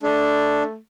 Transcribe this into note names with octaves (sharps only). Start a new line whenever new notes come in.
A3 D4